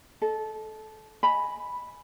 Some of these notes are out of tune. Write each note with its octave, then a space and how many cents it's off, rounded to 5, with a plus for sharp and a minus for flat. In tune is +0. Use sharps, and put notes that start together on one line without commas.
A4 -20 D#5 +0
D#5 +0 G#5 +10 B5 +0